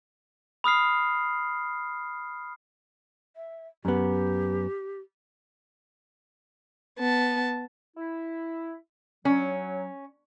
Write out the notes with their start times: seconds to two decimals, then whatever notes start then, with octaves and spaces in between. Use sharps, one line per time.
0.64 B5 D#6 F6 C7
3.36 E5
3.85 F#2 B3 G4
6.99 B3 A5
7.97 E4
9.25 F#3 C#4